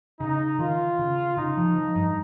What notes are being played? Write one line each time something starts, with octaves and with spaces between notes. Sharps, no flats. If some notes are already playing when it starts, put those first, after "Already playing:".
C#3 D#4
D#3 F4
C#3
C#3 D#4
F3
F3
G2